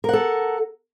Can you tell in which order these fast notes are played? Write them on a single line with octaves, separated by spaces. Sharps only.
A#4 F#5 A4